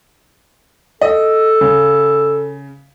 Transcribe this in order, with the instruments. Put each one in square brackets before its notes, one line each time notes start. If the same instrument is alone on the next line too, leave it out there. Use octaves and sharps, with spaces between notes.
[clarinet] A4 [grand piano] D#5
[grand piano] C#3